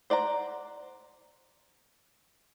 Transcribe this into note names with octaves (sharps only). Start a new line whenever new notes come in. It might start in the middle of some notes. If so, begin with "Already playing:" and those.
C5 D5 F#5 A#5